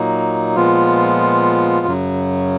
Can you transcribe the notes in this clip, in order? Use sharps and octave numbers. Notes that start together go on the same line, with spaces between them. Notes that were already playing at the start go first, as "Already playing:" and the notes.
Already playing: A#2 F#3 A#3 D#4
A#2 F3 G#3 B3 F4
F#2 C#3 F#3